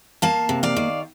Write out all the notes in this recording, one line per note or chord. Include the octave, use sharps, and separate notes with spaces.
A#3 F5 A5
C3
D5 F5
D#3